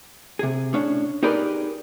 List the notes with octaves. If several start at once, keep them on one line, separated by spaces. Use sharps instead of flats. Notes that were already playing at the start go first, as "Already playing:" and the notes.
C3 G#4
A2 C#4 D4
D#4 G4 G#4 A#4 B4 D5